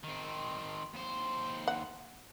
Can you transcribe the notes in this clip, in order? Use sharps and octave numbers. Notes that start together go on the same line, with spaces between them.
D#3 C4
D#2 C5
F#5